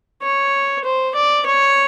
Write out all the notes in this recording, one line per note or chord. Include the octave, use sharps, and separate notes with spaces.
C#5
C5
D5
C#5